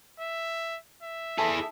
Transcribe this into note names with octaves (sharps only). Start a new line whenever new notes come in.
E5
E5
E4 G#4 A4